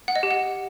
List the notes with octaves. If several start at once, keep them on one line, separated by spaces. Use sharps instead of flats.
F#5
D#5
G4
F#5